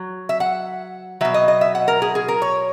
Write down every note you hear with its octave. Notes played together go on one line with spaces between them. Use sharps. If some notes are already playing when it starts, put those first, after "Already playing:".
Already playing: F#3
E5
F#5
B2 F#3 E5
D#5
D#5
E5
F#5
A#4
G#4
G#4
A#4
C#5